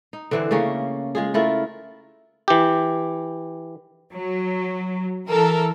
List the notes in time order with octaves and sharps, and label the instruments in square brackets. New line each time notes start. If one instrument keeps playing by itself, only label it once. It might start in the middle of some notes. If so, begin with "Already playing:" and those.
[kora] D#4
D3 E3 C4
C#3 A3 A#3 C#4
G#3 F4 G#4
A3 E4 F4 A#4
[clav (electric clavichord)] E3 G4
[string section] F#3
E3 A4 A#4